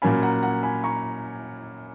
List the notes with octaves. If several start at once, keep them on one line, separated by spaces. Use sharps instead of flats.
A#2 F#3 A#3 C#4 G#5 B5
F#5 A#5
F#5 A#5
G#5 B5
A#5 C#6